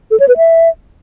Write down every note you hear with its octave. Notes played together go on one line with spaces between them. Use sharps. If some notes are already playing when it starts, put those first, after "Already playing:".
A4
C#5
B4
E5